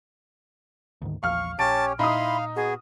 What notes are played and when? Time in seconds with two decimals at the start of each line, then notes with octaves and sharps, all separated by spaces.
1.02 D2 G#2 D#3
1.23 A#1 E2 F3 F5 C#6 F6
1.59 A#1 C#4 G4 C#5 A5 D7
1.99 A#2 D#4 E4 F5 B5 C6 D#6
2.56 B3 F#4 G#4